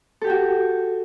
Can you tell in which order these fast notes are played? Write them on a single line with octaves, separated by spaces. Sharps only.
A4 G4 G5 F#4